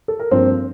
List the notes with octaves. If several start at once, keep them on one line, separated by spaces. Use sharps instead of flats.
A4
A#4
G2 F3 A#3 C4 C5